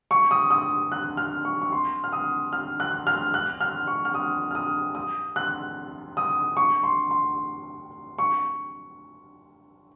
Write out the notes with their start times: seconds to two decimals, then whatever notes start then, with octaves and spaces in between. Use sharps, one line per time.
0.11 C#6
0.31 D#6
0.51 D#6
0.92 F#6
1.17 F6
1.45 C#6
1.62 C#6
1.72 C6
2.04 F6
2.12 D#6
2.53 F6
2.80 F#6
3.07 F6
3.34 F#6
3.61 F6
3.87 C#6
4.05 F6
4.14 D#6
4.51 F6
4.55 D#6
4.95 D#6
5.36 F#6
6.17 D#6
6.57 C#6
6.83 C6
7.11 C6
8.19 C#6